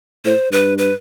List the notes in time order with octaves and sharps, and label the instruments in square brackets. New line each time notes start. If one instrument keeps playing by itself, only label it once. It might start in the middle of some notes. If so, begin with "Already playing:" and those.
[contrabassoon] A2 [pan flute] C5
[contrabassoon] G2 [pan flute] B4
[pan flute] B4